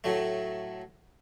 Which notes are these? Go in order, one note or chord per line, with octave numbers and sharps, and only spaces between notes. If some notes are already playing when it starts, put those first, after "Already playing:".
A2 F#3 A3